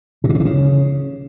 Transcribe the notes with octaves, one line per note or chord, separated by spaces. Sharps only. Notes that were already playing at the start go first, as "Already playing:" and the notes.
A#2
C3
B2
E3
C#3